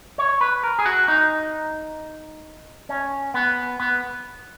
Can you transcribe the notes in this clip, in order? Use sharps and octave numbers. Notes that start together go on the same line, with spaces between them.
C#5
B4
A#4
G#4
F#4
D#4
C#4
B3
B3